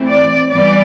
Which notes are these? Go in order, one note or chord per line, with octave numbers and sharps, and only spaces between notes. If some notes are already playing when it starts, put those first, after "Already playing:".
Already playing: E3 A3 C4
D5
E3 G3 B3 D5